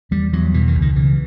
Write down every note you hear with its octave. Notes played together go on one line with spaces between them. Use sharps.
E2 G3
E2 F#3
B2 E3
D#3
C#2
D#3
C#3 E3